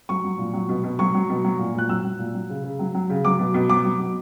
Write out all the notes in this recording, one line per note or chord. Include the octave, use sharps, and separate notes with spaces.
F#3 C#6
F#3
A#2
F#3
B2
B2
F#3 C#6
F#3
B2
F#3
A#2
A#2 F#6
F#3 E6
F#3
A#2
F#3
C#3
C#3
F#3
F#3
C#3
F#3 D6
B2
B2
F#3 D6
F#3
B2